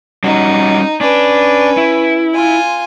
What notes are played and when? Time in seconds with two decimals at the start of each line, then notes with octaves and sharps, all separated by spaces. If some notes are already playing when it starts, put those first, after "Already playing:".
0.24 G3 C#4 D#4 F#4
1.01 C#4 D4 B4
1.77 E4
2.34 F4 G#5